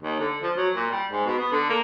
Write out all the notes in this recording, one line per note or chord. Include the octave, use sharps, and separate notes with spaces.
D#2
D3
F3
F#3
A#2
G3
G#2
B2
B3
D3
A#3